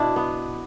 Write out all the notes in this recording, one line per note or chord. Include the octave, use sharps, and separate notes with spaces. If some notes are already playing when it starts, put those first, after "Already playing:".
Already playing: B2 D4 E4
B3